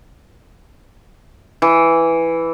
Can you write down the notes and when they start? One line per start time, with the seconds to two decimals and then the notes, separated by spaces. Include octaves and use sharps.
1.62 E3